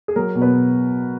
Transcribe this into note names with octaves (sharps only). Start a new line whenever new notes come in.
G#4
F#3 A#4
B2
B3 B4